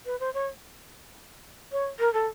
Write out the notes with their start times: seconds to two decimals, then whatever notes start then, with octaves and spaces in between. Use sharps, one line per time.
0.06 B4
0.20 C5
0.34 C#5
1.72 C#5
1.99 A#4
2.14 A4